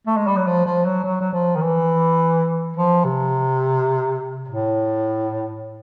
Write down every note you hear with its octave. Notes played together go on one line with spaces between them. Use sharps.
A3
G#3
G3
F#3
F3
F3
F#3
F#3
F#3
F3
D#3
E3
F3
C3
A2